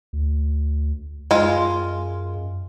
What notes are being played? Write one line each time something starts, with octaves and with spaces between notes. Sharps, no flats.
D2
F#2 G#3 F4